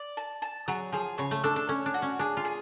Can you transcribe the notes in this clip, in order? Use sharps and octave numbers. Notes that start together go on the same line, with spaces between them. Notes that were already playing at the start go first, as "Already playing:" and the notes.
Already playing: D5
A5
A5
F#3 G#4
F3 G#4
C#3 C#5
A3
D4 A4
D4
C#4 C#5
D4
F#4
C#4
D4 G#4
F4
G#4